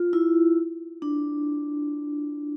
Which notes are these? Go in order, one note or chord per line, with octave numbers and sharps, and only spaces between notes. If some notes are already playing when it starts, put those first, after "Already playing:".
Already playing: F4
E4
D4